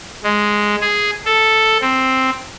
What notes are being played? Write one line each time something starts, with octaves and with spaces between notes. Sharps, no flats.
G#3
G#4
A4
C4